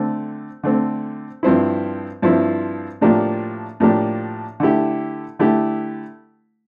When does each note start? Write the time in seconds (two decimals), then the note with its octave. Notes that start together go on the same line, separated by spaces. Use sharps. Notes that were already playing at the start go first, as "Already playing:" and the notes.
Already playing: D3 A3 C4
0.63 D3 A3 C4
1.43 G2 F3 C4 E4
2.22 G2 F3 C4 E4
3.01 A2 F3 A#3 D4 G4
3.80 A2 F3 A#3 D4 G4
4.60 D3 A3 E4 G4
5.39 D3 A3 E4 G4